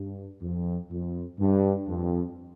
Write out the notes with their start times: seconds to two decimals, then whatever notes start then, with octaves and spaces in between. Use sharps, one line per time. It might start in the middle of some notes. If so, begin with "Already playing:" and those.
Already playing: G2
0.43 F2
0.90 F2
1.39 G2
1.88 F2